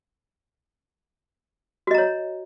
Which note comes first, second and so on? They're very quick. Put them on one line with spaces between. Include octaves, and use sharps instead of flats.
F#4 D#5 A#5 C#5